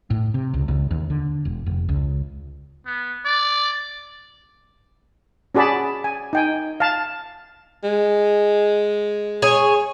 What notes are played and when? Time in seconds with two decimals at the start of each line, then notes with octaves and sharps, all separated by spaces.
0.10 A2
0.34 C3
0.54 C#2
0.68 C#2
0.91 D#2
1.10 D3
1.45 E1
1.66 F1
1.89 C#2
2.86 B3
3.25 D5
5.55 C#4 F#4 G#4 D5 A5 B5
6.04 G#5
6.33 D#4 G5 G#5
6.80 F5 A5
7.84 G#3
9.42 G#4 C#5